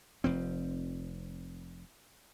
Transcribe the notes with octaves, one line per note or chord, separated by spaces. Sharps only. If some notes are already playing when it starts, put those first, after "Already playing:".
F1 F3 C4